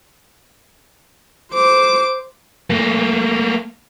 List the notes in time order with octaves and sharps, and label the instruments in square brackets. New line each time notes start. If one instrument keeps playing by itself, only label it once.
[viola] C5 D6
[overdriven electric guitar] A3 A#3